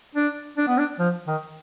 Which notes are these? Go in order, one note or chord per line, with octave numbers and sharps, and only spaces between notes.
D4
D4
B3
D4
F3
D#3